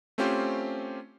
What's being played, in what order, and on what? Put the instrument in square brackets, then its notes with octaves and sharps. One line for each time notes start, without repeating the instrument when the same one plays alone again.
[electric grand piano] A3 C4 C#4 F4 G4 C5